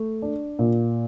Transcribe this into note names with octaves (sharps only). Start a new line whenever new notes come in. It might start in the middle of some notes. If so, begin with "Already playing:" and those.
Already playing: A3
D4
A#2